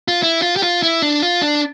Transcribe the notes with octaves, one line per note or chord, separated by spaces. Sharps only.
F4
E4
F4
G4
F4
E4
D4
F4
D4